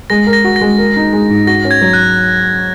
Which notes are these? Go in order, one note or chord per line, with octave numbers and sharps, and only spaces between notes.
G#3 A#6
A#4
A#6
F#4
A#6
G#3
A#4
D#4
G#3
G#2
F#4 A#6
C#4
G#6
F#3
F#6